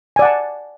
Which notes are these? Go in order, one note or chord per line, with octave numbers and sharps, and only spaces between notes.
D5 F#5 G#5 A5